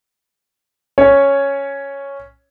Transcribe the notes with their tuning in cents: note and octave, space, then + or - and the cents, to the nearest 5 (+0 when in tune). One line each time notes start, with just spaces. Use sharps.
C#4 +0 C#5 +0